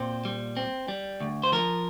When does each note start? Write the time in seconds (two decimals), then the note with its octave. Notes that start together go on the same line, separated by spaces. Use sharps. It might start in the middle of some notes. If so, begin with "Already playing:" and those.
Already playing: A#2 C4 C5
0.25 G3
0.57 C4
0.88 G3
1.20 D2
1.43 C5
1.52 F3 A#4